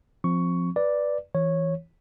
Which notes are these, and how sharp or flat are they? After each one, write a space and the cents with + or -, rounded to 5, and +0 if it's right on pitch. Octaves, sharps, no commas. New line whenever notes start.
F3 +0 C4 +0 C#6 +10
B4 -10 D5 +0
E3 +0 C#5 -10